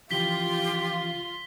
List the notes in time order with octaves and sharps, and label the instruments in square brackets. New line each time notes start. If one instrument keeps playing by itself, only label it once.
[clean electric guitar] C#3 E3 F3 [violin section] F4 C6 [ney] G4 [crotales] B6 G7